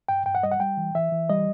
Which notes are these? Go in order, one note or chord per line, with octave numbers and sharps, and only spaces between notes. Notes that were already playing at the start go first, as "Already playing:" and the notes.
G2 G5
G2 G5
F#5
G3 D#5
F#5
G3 G5
E3
E3 E5
E3
G3 D#5